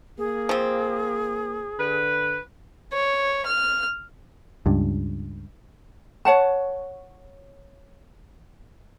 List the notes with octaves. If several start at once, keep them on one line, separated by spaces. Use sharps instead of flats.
A#3 G#4
F3 C4
D3 B4
C#5
F6
C#2 G2
C#5 F#5 A5